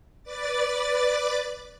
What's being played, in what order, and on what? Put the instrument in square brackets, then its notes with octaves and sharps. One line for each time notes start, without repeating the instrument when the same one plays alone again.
[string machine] B4 D5 D6 A6